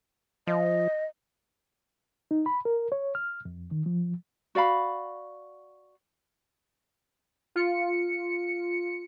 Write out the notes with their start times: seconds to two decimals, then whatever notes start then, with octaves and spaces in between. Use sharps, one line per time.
0.47 F3 D#5
2.31 D#4
2.46 B5
2.65 A#4
2.92 C#5
3.15 F6
3.45 F2
3.71 D#3
3.86 F3
4.55 F#4 D5 F5 B5
7.55 F4 C#7